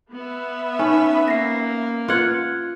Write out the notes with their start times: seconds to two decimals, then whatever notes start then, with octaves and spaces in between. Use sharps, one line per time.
0.12 B3 E5
0.79 C#4 D#4 B4
1.28 A#3 A#6 C7
2.08 F4 B4 F#5 G#6 C#7